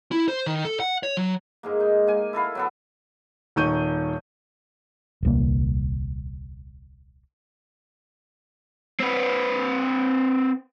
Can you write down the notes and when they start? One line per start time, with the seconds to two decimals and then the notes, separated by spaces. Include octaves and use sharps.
0.12 E4
0.28 C5
0.46 D#3
0.65 A4
0.80 F#5
1.03 C#5
1.17 F#3
1.63 G#2 G#3 A#3
1.80 D#4
2.07 A#3 G#5
2.33 E4 A4 A#4 F5
2.55 F#3 B3 A4
3.56 D#1 D#3 C#6 G6 D#7
5.23 D#1 C2 A#3
9.00 C4 B4